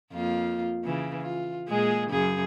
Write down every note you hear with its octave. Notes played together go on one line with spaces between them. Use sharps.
F2 A#3 F4
C#3 E3
F4
A#2 G#3 G#4
F#2 C#3 G#4